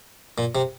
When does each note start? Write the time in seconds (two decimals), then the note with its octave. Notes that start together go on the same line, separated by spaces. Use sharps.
0.38 A#2
0.55 C3